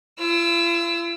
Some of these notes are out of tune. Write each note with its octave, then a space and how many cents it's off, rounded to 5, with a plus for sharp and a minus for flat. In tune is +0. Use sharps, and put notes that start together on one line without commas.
F4 -45 E6 +0